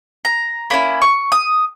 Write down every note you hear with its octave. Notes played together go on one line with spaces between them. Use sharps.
A#5
A#3 C#4 E4 B5
C#6
D#6